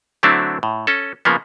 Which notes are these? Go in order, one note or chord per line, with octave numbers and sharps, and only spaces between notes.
D3 F#3 A3 C4 D4 E4
A2
C#4 A4
C#3 F3 A#3 B3